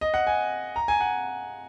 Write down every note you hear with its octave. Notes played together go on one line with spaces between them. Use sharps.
D#5
F#5
G#5
A#5
G#5
F#5